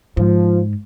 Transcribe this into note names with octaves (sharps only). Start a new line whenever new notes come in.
G#2 F3